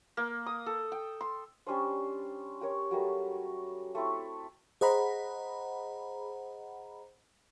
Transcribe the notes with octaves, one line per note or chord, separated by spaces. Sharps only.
A#3
D#6
A4
G5
C6
G3 C#4 D4 C5
G4 A#4 C#5
F#3 G3 A3 A#4
A3 C4 E4
G#4 C5 D#5 F#5 A#5 B5